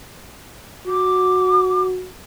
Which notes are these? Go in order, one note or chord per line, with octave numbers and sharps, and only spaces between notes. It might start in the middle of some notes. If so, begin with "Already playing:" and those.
F#4 D6